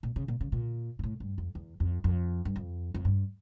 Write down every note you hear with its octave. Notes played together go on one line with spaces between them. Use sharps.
A#2
C#3
A#2
C#3
A#2
A#2
A2
G2
F2
E2
F2
F2
G2
F2
F2
G2